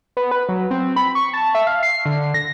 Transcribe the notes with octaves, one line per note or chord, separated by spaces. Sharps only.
B3
B4
F#3
C4
B5
C#6
A5
E5
F5
C7
D3
A#6